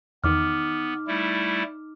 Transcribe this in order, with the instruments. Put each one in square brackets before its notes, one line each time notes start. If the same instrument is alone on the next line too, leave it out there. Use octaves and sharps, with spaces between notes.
[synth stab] E2 D#3 [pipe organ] B3 [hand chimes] D#4 D6 F6
[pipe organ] G3 A3 E4